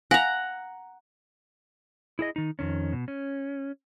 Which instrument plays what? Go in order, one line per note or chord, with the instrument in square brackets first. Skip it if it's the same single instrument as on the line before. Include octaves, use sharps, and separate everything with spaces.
[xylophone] F5 G#5 A#6 [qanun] F#5 A#5
[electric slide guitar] E4 G#4 D#5
D#3 D#4
F2 D#3 C#4
B2
C#4